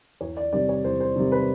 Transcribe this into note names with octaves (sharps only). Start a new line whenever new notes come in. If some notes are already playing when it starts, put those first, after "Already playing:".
E2 C#5
D5
C3 D#3 G3 D5
C#5
E2 C5
C5
C3 D#3 G3
B4